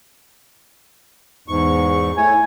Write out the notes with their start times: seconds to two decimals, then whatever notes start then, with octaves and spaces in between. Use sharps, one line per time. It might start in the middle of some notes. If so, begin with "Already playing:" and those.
1.48 E2 G#2 C#6
2.17 A3 E4 C#5 G#5